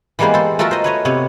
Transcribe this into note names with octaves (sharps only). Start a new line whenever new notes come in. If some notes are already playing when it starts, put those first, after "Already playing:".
E3 G3 G#3 A#3 B3 C5
A4 C5
A3 F4 F#4 A4 A#4 E5
C5 D#5
B4 C#5 D#5
C3 B3 C#5